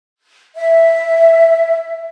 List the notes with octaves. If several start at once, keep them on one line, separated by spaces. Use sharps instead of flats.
E5